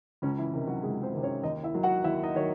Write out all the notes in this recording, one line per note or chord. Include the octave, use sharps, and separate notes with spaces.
C#2 C#3 C#4
E3 E4
C3 D#3
F#3 F#4
C#2 G#3 G#4
C4 C5
C3 D#3
C#4 C#5
D#2 D#4 D#5
E4 E5
D#3 F#3
F#4 F#5
D#2 E4 E5
D#4 D#5
D#3 F#3 C#5